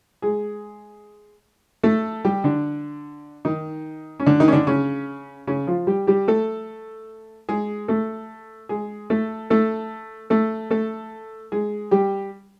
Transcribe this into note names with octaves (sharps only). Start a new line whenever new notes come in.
G#3 G#4
A3 A4
G3 G4
D3 D4
D#3 D#4
C#4
D3 D4
D#3 D#4
C#4
D3 D4
C#3 C#4
C#3 C#4
F3 F4
G3 G4
G3 G4
A3 A4
G#3 G#4
A3 A4
G#3 G#4
A3 A4
A3 A4
A3 A4
A3 A4
G#3 G#4
G3 G4